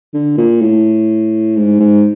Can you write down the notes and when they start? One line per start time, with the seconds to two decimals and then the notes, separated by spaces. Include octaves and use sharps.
0.14 D3
0.37 A#2
0.61 A2
1.56 G#2
1.80 G#2